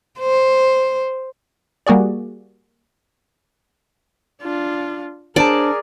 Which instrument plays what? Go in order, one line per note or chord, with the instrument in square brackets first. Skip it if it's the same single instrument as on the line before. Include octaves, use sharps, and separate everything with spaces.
[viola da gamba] C5
[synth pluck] G3 A#3 F#4 G#4 D5
[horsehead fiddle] D4 F4
[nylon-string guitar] D4 C5 A5 [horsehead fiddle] G#4 A#4 [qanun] D5